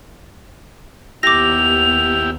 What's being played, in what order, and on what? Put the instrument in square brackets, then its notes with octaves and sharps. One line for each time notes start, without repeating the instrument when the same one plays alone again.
[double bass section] D#2 B3 [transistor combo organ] E4 G4 [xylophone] D6 A#6 [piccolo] F7